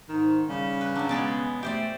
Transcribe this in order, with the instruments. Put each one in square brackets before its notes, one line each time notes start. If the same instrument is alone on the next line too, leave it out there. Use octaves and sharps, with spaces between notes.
[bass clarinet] G#2 [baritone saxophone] D#3
[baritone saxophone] C#3 [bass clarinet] G3
[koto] B4
[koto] B2 F#3 [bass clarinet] D4
[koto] G#3 G#4 D5 [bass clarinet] B3
[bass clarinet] A3 [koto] G4 C5 D5